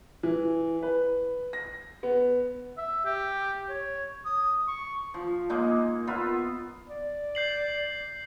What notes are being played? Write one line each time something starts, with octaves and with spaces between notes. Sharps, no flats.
E3
B4
A#6
B3
E5
G4
C#5
D#6
C#6
F3
G#3 A#3 D#4
B3 F4 A#4 E5
D5
G6 C7 F#7